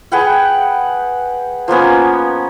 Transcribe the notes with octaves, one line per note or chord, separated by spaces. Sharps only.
G#4 B4 F#5 G5
F3 A#3 B3 C#4